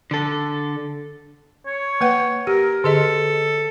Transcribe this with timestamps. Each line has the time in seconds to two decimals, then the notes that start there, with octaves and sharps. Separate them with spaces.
0.11 D3 A4
1.66 C#5
2.01 A#3 B4 F#5
2.47 G4 A#4
2.84 D3 G#4 A4 D#5